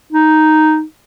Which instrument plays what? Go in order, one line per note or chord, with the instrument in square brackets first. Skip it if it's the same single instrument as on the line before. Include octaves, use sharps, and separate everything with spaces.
[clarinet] D#4